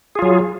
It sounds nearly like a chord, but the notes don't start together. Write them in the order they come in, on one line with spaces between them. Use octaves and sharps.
G#4 F4 F#3